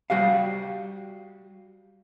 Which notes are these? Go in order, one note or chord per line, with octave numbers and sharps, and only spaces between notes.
G3 F#4 G4 F5